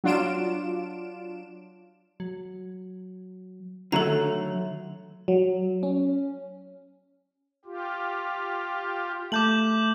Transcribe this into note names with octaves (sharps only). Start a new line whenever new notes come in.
F#3 D4 F4 D7 E7
F#3
D3 D#3 F#3 A3 A4 A#5
F#3
C#4
F4 G4
A3 A5 D6 G6 F#7